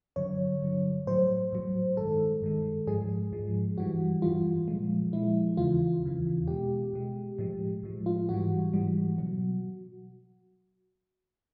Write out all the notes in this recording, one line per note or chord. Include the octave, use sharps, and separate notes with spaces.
G2 D3 F#3 C#5
G2 D3 F#3
A2 F#3 C5
A2 F#3
G2 D#3 G#3 A4
G2 D#3 G#3
G#2 F3 G#3 G#4
G#2 F3 G#3
G2 E3 G3 F#4
G2 E3 G3 F4
A#2 F3 G#3
A#2 F3 G#3 E4
E2 C#3 E3 F4
E2 C#3 E3
B2 G#3 G4
B2 G#3
A2 F3 G#3
A2 F3 G#3
F4
G#2 E3 G3 F#4
G#2 E3 G3
B2 F#3